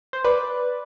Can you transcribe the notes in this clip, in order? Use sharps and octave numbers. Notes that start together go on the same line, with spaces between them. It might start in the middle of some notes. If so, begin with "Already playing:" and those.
C5
B4 D5